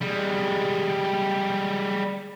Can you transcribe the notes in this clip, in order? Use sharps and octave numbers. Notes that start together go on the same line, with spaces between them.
G3 G#3